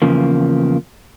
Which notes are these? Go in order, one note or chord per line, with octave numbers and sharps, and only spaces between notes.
E2 C#3 F3 A#3